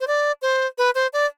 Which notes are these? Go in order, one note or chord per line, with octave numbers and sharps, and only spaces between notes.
C5
D5
C5
B4
C5
D5